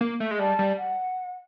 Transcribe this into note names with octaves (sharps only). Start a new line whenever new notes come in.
A#3
A3
G#3
G3 A5
G3
F#5